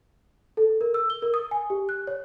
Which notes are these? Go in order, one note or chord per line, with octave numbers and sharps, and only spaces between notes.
A4
A#4
E6
G7
A#4
D#6
G#5
G4
F#6
C#5